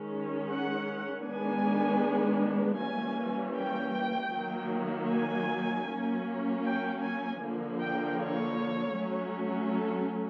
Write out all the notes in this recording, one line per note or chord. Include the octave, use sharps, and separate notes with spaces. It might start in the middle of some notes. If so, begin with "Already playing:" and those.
Already playing: D#3 G#3 C#4
F#5
D#3 G#3 B3 D4 G#5
E3 G3 A#3 C#4 G#5
G5
D#3 F#3 A#3
G#5
F#3 A#3 C#4
G5
G#5
D3 F3 A#3
G5
C#5
F#3 A3 C#4
A4